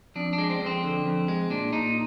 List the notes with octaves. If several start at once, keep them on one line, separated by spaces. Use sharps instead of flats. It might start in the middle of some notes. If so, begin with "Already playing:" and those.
F2 D4
D4
G#3
C4
F2
C4
D3
F2
G#3
A#2 D4
A#2 D#4